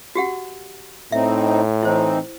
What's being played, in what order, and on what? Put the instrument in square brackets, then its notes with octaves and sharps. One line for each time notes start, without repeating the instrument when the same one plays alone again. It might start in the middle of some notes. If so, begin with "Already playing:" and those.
[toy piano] F#4 G4 F#5
[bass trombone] A2 [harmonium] C4 D#4 [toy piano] E5
[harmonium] E3 C4 D#4 [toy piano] E4 C5